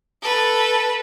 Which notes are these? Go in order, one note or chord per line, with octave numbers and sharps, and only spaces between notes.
A4 B4